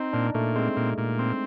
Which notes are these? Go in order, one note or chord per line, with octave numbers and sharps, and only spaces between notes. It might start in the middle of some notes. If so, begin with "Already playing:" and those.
Already playing: C4 D#4
A#2 D4
A#2 A3
G#3 C4
A#2
A#2
C4